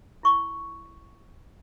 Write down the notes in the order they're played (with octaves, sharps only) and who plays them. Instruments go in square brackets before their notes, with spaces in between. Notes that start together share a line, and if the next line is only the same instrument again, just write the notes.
[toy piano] E4 C#6